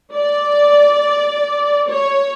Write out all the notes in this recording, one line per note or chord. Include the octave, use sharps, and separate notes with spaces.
D5
C#5